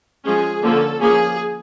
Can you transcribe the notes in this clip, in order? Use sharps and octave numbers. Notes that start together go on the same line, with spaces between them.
F3 G#3 C#4 G#4
D3 F3 A#3 C#4 A4
F3 A#3 C#4 G#4